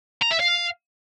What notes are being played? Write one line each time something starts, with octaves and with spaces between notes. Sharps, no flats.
A#5
E5
F5